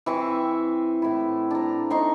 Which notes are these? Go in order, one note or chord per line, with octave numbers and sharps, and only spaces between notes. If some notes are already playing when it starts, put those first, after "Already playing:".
E3 C4 E5 C#6
A2 E4
D4 A#5
D#4 C6 C#6